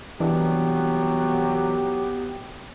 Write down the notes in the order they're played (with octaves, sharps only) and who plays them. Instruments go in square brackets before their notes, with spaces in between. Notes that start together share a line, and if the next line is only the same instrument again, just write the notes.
[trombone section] C2 F#3 [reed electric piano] E3 D4 [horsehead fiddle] B3 [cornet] G4